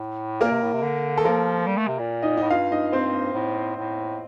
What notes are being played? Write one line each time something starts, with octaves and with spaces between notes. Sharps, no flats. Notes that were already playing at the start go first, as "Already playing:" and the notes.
Already playing: A2
A#2 A#3 A#4
C3
A2
C3
D3
D#3 A4
F3 A#3 A#4
G3
A3
C3
A#2
D#4 D#5
A2 D#4 D#5
G2 F4 F5
D#4 D#5
C4 C5
A2
A2